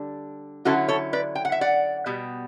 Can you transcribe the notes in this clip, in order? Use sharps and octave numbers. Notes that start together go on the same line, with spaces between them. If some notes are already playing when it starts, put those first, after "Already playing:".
Already playing: D3 G3 D4
D3 F#3 C#4 E4 F#4 A4
A4 C#5
B4 D5
G5
F#5
E5
D5 F#5
B2 G3 B3